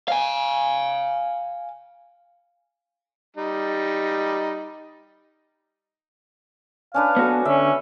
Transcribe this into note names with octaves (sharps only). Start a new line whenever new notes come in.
F5 G#5
G3 D#4
C#4 D4 B4 F5
B3 F#4 A4
D3 C#4 E5